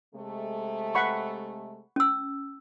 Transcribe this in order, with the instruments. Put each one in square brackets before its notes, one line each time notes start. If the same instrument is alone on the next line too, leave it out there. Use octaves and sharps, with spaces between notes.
[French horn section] C3 G#3 A3
[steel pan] F#5 B5 C#6
[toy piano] C#4 E6